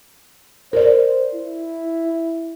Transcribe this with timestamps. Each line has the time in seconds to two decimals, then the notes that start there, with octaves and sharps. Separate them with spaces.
0.73 A#4 C5 D5
1.35 E4